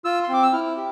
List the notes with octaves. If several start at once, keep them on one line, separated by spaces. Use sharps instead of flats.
F4 E6
C6
C4 D6
E6
E4 F6
G4